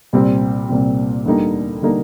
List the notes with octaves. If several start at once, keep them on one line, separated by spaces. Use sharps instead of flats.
C2 A#2 G3 C4
C2 A#2 G3 C4
D2 D3 G3 A#3 D#4
D3 G3 A#3 D#4